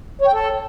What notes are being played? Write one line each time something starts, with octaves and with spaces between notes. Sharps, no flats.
C#5
G5
A4